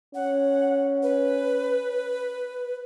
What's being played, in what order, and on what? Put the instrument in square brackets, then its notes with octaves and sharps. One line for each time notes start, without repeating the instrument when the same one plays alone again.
[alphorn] C#4 [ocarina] F#5
[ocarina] B4